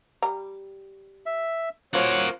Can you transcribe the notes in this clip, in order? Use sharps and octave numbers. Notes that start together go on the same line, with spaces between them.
G3 A#5
E5
F3 A#3 F4 F#4 A#4 C#5 F#5